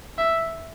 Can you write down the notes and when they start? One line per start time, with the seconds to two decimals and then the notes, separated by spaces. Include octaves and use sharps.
0.18 E5